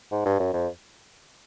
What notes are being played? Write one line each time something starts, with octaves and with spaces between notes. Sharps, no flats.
G#2
G2
F#2
F2